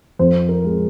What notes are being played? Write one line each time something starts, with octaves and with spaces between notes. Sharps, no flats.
F2 C5
A#4
G#3